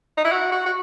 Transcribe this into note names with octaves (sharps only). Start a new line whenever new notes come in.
D#4
E4
F#4
F#4
F#4